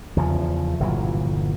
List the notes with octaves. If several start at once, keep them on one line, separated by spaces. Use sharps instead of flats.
E2 C#3 F3
G1 A#2 E3 F#3